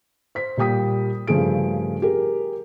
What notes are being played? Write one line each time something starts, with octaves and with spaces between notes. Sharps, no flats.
C5 B6
A#2 G3 G5 D#6 B6
G2 C#3 F3 A3 G#4 D7
G4 G#4 A#4